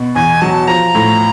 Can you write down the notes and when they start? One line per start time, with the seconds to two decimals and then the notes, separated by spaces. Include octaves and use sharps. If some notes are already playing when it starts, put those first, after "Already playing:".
Already playing: B2
0.15 E2 G#5
0.41 F#3 A5
0.67 F3 A#5
0.95 A2